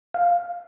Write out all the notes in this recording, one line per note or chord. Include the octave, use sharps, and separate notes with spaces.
F5